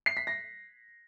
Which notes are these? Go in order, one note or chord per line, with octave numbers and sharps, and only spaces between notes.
C7
B6
A#6